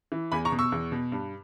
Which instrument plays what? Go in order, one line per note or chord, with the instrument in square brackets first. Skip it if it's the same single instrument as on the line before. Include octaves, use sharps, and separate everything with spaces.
[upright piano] E3
E2 G#5 B5
A#5 C#6
B2
C#6 E6
E2
B2
G2